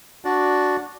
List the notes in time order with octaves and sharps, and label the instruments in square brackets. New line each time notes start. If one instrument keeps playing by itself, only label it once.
[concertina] D4 F#4 D5